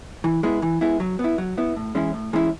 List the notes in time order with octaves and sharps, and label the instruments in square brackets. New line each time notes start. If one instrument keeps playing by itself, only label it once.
[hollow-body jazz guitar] E3
G#3 B3 E4
E3
G#3 B3 E4
F#3
B3 E4
F#3
B3 E4
A2
E3 G#3 C#4 E4
A2
E3 G#3 C#4 E4